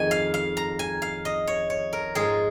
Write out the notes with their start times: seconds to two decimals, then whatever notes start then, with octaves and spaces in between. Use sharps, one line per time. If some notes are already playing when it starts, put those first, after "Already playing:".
Already playing: F2 D#3 G#3 G#5
0.11 F5
0.34 F5
0.57 A#5
0.79 G#5
1.02 F5
1.25 D#5
1.47 C#5
1.70 C#5
1.93 A#4
2.15 G#2 G#3 F4 G#4